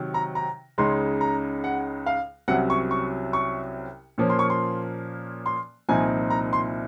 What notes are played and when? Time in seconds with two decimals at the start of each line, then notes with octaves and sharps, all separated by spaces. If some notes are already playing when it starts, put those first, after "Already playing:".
Already playing: C3 D#3 F#3
0.14 A#5
0.35 A#5
0.78 C#2 C#3 G#3 D#4 C6
1.21 A#5
1.64 F#5
2.06 F5
2.48 C2 C3 F#3 C#4 F#5
2.70 C#6
2.91 C#6
3.33 C#6
4.18 A#2 F3 A#3 C#4
4.30 C6
4.39 C#6
4.50 C6
5.46 C6
5.89 C2 A#2 F3 C4 D#4 G#5
6.30 A#5
6.53 C6